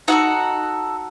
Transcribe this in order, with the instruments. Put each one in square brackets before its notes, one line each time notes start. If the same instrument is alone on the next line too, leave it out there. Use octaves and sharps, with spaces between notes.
[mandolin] D#4 F#4 A4 F#5